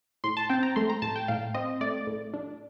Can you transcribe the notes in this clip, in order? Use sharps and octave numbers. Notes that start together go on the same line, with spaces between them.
A2 C6
A5
C4 G5
A#5
A3 C6
A#5
A2 A5
G5
A2 F5
C4 D#5
A3 D5
A2
D4